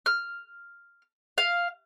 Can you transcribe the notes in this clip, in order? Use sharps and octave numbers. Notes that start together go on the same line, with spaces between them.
F6
F5